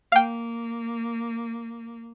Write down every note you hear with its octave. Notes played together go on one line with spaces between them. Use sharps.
A#3 F5 G5